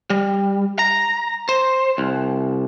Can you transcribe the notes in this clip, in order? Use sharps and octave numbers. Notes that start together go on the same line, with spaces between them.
G3
A#5
C5
C2